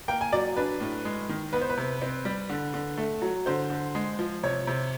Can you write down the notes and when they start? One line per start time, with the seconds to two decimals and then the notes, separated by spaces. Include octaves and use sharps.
0.08 A#3 G5
0.21 G#5
0.33 F#3 D5
0.56 D4 B4
0.80 A2
1.05 G#3
1.29 D#3
1.53 B3 B4
1.61 C5
1.70 B4
1.77 C3
2.02 C4
2.25 G3
2.50 D3
2.74 D3
2.98 A3
3.22 F#3
3.46 D3 C5
3.70 D3
3.95 G#3
4.19 F3
4.43 C3 C#5
4.67 C3